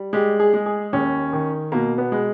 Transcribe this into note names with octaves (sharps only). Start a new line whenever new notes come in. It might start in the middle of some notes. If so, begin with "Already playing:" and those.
Already playing: G3
G#3 G4
G#4
G#3
G#4
D#2 C#4
D#3
B2 A#3
B3
G#3